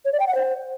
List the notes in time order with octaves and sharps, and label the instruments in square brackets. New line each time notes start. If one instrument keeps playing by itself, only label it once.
[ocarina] C#5
D5
G5
F#5
C5